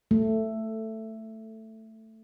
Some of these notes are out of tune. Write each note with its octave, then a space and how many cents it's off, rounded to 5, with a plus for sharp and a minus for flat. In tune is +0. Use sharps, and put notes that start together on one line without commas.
A3 +10